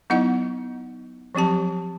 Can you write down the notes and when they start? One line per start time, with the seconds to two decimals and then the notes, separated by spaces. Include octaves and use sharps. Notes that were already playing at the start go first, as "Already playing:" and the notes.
0.10 F#3 B3 D#4 E4 D#5 F#5
1.35 F3 F#3 C4 G4 A5